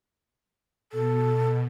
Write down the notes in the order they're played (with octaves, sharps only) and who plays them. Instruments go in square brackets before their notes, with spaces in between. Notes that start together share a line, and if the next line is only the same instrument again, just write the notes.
[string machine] B2 [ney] A4